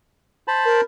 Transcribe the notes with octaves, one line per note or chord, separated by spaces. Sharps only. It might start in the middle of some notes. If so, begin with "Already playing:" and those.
C5 A5 B5
A#4